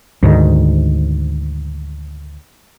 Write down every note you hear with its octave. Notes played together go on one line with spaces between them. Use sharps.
D2 G#2 D#3